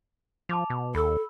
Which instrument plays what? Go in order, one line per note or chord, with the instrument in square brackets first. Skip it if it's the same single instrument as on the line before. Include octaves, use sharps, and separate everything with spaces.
[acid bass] F3 [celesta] A5 D6 F7
[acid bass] B2
[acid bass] D#2 [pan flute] A4 [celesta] B5 E6